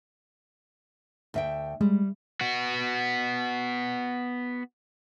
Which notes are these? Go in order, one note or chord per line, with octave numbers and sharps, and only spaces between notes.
D2 E5 G5
G3 G#3
B3 F#4